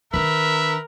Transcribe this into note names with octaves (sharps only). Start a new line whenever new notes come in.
D#3 D4 A#4 B4 E5